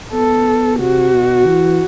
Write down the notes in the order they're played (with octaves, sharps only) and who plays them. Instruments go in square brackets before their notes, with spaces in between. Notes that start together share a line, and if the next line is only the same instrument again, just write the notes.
[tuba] B3 [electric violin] A4
[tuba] C3 [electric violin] F#4
[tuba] B2
E3